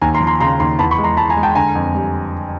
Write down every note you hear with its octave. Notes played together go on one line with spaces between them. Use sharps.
D#2 G#5 A#5
A#5 C6
F3
A#5 C6
C#3 A#5 C6
D#2 A#5 C6
E2 A5 B5
B5 C#6
G#3
A#5 C6
G#3 A5 B5
G#5 A#5
G#3
G5 A5
D3 G#5 A#5
F2
G3